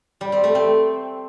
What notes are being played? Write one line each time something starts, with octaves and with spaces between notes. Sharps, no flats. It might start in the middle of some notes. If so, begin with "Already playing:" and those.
G3
C4
A3
C4